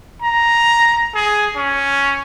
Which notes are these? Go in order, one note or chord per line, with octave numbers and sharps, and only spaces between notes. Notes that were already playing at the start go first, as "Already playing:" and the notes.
A#5
G#4
C#4